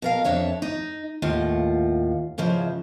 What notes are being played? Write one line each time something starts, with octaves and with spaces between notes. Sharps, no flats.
B2 A#4 F5
F2 D4 C#5 E5
D#4
D#2 A2 F4 F#5
G#2 C#3 E3 F3